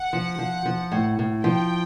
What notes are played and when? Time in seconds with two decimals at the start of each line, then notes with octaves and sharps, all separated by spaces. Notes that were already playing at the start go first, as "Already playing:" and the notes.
Already playing: F#5
0.13 F3
0.39 F3
0.66 F3
0.92 A2
1.19 A2
1.44 F3 G5